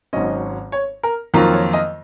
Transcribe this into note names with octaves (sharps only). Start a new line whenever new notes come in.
G#1 G#2 F#3 C#4 D#5
C#5
A#4
F2 D#3 F#3 A#3 F4
C#5
D#5